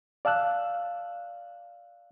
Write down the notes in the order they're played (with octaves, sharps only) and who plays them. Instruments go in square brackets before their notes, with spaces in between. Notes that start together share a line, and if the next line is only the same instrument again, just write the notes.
[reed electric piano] D5 F5 A5 E6 F#6